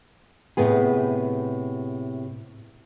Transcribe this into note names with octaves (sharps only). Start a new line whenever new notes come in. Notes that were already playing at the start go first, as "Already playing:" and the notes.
A2 C3 B3 G#4